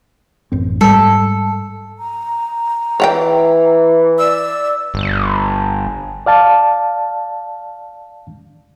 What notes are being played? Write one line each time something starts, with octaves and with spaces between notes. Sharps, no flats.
A1 F#2 C4
G#2 G3 A4
A#5
E3 C#5 F#5 G5
D5 E6
G1
D5 F5 A5